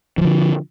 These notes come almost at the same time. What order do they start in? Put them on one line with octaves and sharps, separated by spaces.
E3 F3 D3